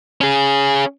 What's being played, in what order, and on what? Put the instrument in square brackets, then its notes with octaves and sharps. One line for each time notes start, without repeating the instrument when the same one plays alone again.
[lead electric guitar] C#4 G#4